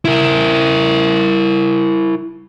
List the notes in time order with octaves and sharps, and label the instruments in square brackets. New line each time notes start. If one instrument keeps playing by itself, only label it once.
[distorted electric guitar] E4 A#4